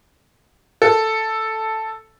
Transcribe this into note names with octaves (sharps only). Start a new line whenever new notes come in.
A4